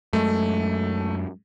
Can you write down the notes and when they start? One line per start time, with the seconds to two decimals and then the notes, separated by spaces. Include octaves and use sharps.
0.13 F#2 G#3 A3